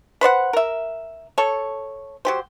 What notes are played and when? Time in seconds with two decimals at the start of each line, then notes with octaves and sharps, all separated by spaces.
0.21 B4 C5 D5 F#5
0.53 A#4 E5
1.38 A4 C#5
2.25 F#3 G4 C5